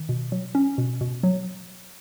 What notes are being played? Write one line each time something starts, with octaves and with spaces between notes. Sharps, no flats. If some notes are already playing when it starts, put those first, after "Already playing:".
Already playing: D#3
B2
F#3
C#4
B2
B2
F#3